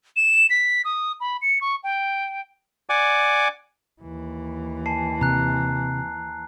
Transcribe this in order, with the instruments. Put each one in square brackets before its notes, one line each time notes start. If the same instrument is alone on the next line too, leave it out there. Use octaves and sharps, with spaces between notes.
[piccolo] E7
B6
D#6
B5
C#7
C#6
G5
[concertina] D5 F#5 G#5 D6
[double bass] D#2 E3
[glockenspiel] G#5 A5 C7
[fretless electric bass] C3 [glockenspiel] A#5 F#6